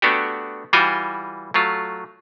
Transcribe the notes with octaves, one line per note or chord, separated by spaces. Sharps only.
A3 B3 D4 F#4 G4
E3 G3 F4 F#4 G5 G#5
F#3 A3 F4